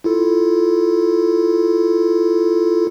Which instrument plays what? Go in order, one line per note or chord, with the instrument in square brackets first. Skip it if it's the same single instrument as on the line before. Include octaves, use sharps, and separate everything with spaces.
[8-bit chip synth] E4 F4 A4